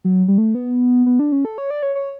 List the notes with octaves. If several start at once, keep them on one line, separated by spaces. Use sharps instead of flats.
F#3
G3
A3
B3
B3
D4
C#4
A4
C#5
D5
C#5
C#5